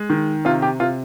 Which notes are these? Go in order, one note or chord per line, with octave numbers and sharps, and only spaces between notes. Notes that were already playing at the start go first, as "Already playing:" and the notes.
Already playing: G#3
D#3
C3 F4
G4
C3 F4